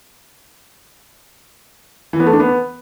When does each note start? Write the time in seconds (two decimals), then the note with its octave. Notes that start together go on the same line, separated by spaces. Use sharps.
2.13 E3
2.20 B3
2.26 A3
2.33 D4
2.40 B3